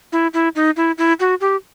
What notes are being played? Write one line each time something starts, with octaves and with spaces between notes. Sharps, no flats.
E4
E4
D#4
E4
E4
F#4
G4